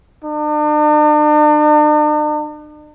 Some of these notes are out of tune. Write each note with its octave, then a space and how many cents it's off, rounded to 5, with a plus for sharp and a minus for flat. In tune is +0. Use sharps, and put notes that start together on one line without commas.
D4 +45